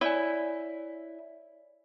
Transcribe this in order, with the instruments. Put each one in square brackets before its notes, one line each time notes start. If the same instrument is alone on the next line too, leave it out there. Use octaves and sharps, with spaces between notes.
[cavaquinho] E4 [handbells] C#5 D5 G#5